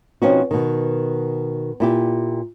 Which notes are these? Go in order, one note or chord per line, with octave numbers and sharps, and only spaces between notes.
B2 F3 C4 C#4 D#4 F#4
B2 D#3
A#2 E4 G4